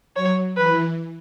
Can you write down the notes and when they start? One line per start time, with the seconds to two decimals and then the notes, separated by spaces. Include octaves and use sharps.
0.16 F#3 C#5
0.57 E3 B4